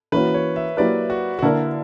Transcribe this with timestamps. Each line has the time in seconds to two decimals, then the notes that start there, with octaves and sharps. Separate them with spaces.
0.12 E3 A#3 C#4 F#4 B4
0.34 C#5
0.56 E5
0.77 F#3 A#3 E4 G4 B4 D5
1.10 F#4
1.39 F#4
1.42 D3 A#3 D4 E4 A#4 D5